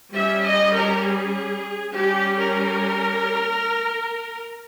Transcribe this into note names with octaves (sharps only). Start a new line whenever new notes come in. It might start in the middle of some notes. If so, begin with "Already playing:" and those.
G3 C#4 E5
D#5
A#4
G#4
G3 C#4 G4
A#4